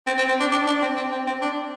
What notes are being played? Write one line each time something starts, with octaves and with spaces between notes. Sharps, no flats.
C4
C4
C4
D4
D4
D4
C4
C4
C4
C4
D4